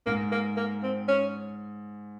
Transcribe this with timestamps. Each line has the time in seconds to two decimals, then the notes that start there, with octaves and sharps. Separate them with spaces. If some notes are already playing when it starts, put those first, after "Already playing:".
0.06 G#2 A#3
0.32 A#3
0.57 A#3
0.83 C4
1.08 C#4